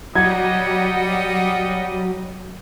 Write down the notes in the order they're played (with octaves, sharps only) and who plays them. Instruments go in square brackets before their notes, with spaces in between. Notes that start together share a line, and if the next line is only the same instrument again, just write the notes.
[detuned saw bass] F#3 [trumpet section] G3 D#5 [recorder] F#5 [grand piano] G#6